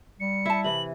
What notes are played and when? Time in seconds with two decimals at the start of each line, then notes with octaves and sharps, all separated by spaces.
0.20 G3 C#7
0.45 E4 E5 A5
0.64 C3 E3 F#7